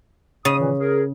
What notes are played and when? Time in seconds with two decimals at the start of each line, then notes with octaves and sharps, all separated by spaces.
0.45 C#3 D#6
0.59 A#2 D#3 E3
0.79 G#4 A#4